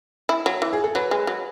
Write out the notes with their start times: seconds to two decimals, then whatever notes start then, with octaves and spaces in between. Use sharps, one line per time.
0.29 E4
0.46 F#3
0.62 E3
0.73 G#4
0.84 A4
0.95 F#3 B4
1.11 G#3
1.27 F#3